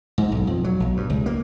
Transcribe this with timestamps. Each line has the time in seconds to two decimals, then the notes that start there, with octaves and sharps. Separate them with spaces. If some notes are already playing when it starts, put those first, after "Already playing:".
0.18 G#2
0.32 B1
0.47 F2
0.64 F#3
0.80 B1
0.97 G2
1.10 C#2
1.26 A#3